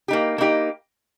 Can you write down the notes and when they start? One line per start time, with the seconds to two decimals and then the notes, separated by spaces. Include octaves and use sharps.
0.08 A#3 D#4 G4
0.38 A#3 D#4 G4